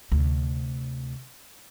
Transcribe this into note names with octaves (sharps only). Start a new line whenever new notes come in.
D2 C3